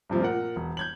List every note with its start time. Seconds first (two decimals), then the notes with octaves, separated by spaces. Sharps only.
0.10 G2 C3 F3 A3
0.21 A#2 A#4 F#5
0.56 E1
0.77 G6 G#6 F#7